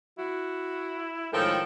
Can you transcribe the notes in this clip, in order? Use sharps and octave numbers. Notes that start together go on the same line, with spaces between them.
E4 F#4
A2 D#3 F3 G#3 A4 A#4 C#5 G5